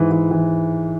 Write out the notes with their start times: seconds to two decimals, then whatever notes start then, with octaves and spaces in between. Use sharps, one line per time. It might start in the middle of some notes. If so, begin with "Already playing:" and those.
Already playing: G#2 E3
0.11 E3
0.31 E3